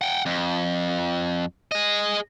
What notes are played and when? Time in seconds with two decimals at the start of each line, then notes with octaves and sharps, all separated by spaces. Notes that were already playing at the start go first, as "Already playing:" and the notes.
0.01 F#5 G5
0.26 F2
1.72 G#4 D#5